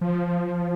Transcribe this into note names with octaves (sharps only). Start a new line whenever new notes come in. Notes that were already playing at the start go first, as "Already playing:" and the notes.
F3